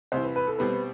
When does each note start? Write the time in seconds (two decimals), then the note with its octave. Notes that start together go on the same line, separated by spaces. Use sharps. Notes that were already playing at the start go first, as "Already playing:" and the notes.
0.12 C2 C3 E3 C5
0.23 B4
0.36 B4
0.47 A4
0.58 B2 G3 C4 B4